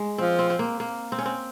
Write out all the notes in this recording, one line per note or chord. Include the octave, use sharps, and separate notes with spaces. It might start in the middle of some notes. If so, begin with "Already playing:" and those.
Already playing: G#3
F3 C4
C4
C4
A#3
A#3
C4
C#4
C4